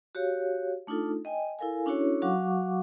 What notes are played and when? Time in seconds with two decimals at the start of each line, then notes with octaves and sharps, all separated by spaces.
0.15 F#4 G4 C#5 F5
0.87 A3 D4 D#4 F4 A4
1.25 D#5 G5 G#5
1.59 E4 A4 A#4 F5 G#5
1.86 C#4 D4 E4 F#4 A4 C#5
2.22 F#3 F#4 F5 F#5 C#6 D6